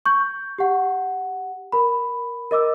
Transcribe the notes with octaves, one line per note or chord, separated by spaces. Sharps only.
C#6 G6
G4 F#5
A#4 B5
A#4 D#5 D6 E6